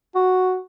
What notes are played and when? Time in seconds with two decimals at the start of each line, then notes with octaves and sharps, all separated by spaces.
0.15 F#4